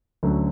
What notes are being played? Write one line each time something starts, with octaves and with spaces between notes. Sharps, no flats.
D2 D3 F#3 A3 C#4